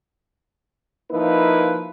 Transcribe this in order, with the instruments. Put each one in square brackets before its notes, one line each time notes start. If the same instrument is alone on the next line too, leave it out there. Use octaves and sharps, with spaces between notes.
[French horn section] F3 A#3 D#4 E4 B4